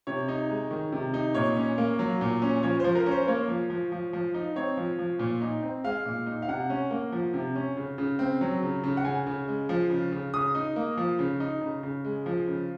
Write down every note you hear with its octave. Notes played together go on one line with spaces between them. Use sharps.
C3 C#5
D#4
G#3
D#3
C3
D#4
A#2 C#5
C#4
A#3
F#3
A#2
C#4
F3 C#5
F3 C5
A#4
C#4 C5
C5
A#3 C#5
F3
F3
F3
F3
D#4
C4 C#5
F3
F3
A#2
D#4
C4
G#3 F5
A#2
D#4
F5
C3 F#5
C#4
A#3
F3
C3
C#4
C#3
C#3
C4
F#3
C#3
C#3
F#5
C#3 G#5
C#3
G#3
F3
C#3
C#3
C#3 D#6
D#4
A#3
F3
C#3
D#4
C#3
C#3
G#3
F3
C#3